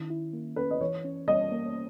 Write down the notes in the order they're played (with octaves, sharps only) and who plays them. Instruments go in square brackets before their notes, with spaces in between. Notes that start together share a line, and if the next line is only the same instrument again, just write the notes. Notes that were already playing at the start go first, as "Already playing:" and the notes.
Already playing: [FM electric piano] D#3 C#4 E4
E4
A#3
[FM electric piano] C#4 [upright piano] B4
[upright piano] D#5
[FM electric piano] E3 [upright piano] C#5
[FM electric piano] C#4
[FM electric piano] G3 [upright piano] D#5
[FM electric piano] A#3